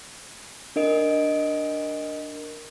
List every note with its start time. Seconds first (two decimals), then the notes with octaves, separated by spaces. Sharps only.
0.76 D4 A#4 D#5 D7